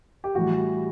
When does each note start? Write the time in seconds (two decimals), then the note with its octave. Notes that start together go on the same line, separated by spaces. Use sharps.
0.24 G4
0.35 A2 E3 G3 F#4